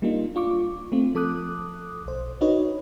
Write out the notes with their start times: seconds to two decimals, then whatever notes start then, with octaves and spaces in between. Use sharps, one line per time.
0.02 G3 A#3 D4 D#4 F4
0.35 D4 F4 C#6 D6
0.92 A3 C4 F4
1.15 F3 A4 D6 D#6 F#6
2.06 B1 C5
2.41 D4 D#4 F#4 B4 C#5 D#5